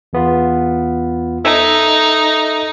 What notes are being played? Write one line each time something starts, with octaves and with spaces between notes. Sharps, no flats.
E2 B3 F4
D#4 A4 E5 G#6